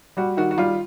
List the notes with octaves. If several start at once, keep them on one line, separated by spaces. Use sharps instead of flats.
G3 F#4
D#3 F#4
F#4
G3 F4